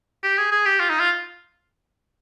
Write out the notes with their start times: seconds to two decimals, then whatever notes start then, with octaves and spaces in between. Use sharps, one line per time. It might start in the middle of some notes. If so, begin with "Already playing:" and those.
0.23 G4
0.38 G#4
0.51 G#4
0.66 G4
0.80 F4
0.90 D#4
1.00 F4